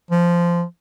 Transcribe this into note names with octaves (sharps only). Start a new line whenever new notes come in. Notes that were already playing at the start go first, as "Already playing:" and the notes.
F3